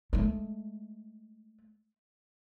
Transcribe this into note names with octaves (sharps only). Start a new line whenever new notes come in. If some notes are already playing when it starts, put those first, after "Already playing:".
G#3 A3